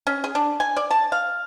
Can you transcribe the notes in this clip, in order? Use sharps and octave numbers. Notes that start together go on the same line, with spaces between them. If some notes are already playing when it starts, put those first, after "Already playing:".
C#4
G#4
D4
G#5
D5
A5
F5